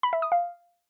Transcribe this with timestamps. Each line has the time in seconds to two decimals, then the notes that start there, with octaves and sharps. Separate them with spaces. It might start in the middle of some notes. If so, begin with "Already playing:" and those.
0.03 B5
0.13 E5
0.22 D#6
0.32 F5